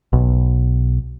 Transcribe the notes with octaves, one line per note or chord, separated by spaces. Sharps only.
B1